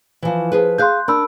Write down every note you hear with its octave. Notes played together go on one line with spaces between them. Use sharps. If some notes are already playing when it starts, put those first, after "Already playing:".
E3 F3
F3 G#4 B4
G#4 F5 C6 F#6 G6
D4 A#4 B5 E6